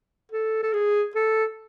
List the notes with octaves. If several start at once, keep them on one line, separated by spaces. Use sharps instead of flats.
A4
A4
G#4
A4